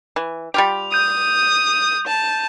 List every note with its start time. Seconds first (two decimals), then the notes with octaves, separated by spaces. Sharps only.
0.16 E3
0.54 G3 F4 G4 F7
0.92 D#6 G6 D#7
2.07 A5